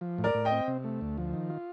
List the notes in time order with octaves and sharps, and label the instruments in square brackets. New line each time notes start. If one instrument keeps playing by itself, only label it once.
[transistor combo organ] F3
A2
[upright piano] A#4 D5
[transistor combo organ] A2
[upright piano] D#5 G5
[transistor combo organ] C4
C3
A3
D2
F3
D#3
F4